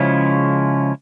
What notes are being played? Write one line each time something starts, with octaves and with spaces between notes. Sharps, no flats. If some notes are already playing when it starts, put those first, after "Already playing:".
Already playing: C#3 F3 G#3 C#4 E4